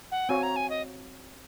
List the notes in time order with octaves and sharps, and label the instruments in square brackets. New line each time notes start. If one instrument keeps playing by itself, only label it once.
[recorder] F#5
[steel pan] C4 F#4 C#5 F5 [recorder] G#5
[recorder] A#5
G#5
D#5